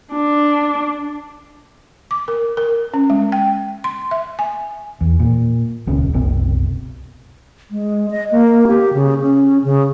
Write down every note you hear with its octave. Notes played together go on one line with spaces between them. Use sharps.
D4
D6
A#4
A#4
C#4
G#3
G5
C6
E5
G#5
E2
A#2
D#1 C#2 C#4
F#1 C2 B2 C4
G#3
D#5
A#3
G4
C#3
C#4
C#3